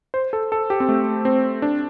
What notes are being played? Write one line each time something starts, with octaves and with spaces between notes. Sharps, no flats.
C5
A4
A4
G4
C4
A3
C4
D4